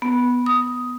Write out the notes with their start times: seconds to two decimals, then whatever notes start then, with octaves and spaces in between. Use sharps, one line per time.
0.02 B3
0.46 D#6